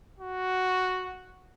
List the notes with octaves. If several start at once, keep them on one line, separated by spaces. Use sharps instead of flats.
F#4